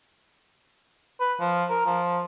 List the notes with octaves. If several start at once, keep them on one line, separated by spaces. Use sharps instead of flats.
B4
F3
A#4
F3